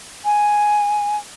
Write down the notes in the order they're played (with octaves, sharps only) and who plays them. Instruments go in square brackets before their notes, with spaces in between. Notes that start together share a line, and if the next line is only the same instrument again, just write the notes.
[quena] G#5